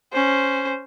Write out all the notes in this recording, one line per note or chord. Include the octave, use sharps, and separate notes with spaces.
C#4 C5